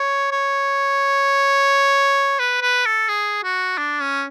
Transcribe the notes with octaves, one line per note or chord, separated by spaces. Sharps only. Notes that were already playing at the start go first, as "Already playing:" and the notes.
Already playing: C#5
C#5
B4
B4
A4
G#4
F#4
D4
C#4